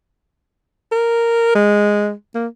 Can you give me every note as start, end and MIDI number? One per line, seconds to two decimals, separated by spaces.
0.92 1.54 70
1.55 2.12 56
2.35 2.47 58